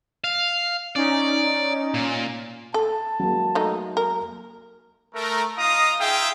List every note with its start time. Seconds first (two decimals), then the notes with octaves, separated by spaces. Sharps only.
0.24 F5
0.96 C#4 D#4 D5
1.94 A#2
2.74 A4 A5
3.20 F#3 G#3 A#3
3.55 A3 D#4
3.97 A#4
5.14 A3 A#4
5.58 D#4 F4 D#5 F5 A#5 D#6
5.99 D#4 F4 G#4 E5 F5 G5